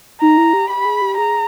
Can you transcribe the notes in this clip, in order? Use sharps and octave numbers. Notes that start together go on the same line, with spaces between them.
D#4 A#5
E4
G4
G4 B5
G#4
G4
G#4 A#5